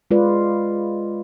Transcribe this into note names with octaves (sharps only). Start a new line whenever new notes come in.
G#3 F4 B4 D5